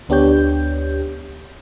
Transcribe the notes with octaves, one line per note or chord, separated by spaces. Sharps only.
D2 B3 D4 G4 C#5 G6